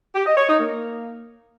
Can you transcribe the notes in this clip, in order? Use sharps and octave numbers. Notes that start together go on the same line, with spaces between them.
G4
D#5
C#5
D#4
A#3